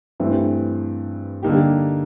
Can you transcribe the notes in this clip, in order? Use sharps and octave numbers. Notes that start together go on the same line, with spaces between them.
G2 E3 A3 C4
D3 G3 A#3 D#4 G4